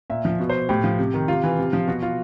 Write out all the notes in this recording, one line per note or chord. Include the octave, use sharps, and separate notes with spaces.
A#2 E5
F3
B2
C5
A2 G4
F3
C3
D#3
C3 F4
E3
C3
F3
B2 F#4
F4